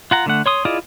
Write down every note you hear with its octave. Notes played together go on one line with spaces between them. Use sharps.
F4 F#5 A#5
D3 A3 F#5
C#5 C6 D#6
E4 F4 G#4 D5 D#5